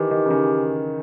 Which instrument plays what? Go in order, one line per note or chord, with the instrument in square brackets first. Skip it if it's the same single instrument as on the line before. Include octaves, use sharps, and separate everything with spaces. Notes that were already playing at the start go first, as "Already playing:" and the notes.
Already playing: [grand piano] D#3 E3 [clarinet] G4
[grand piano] D#3
C#3
D#3